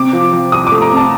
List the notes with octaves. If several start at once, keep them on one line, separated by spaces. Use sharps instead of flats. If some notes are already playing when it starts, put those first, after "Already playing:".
Already playing: C3 D6
F3
F3
C2 D#6
D6
A3
A#5
C3
A5